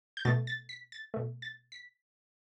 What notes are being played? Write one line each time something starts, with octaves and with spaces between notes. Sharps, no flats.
G6
B2 A3 A6
A6
B6
A6
B2 A3
A6
B6